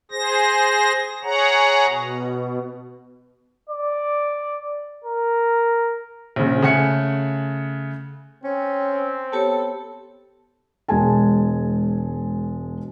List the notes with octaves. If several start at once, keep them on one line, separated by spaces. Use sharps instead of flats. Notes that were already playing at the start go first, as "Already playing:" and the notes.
G#4 C5 A#6
G#4 C#5 F#5 A#5
B2
D5
A#4
A#1 C#3
C#3 A3 F#5 G#5 F#6 C#7
C4 C#4
B3 G4 A4 C#5
E1 G#3 G#5 A5